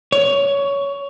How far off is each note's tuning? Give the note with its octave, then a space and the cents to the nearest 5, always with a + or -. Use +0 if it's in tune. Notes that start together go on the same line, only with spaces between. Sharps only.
C#5 +15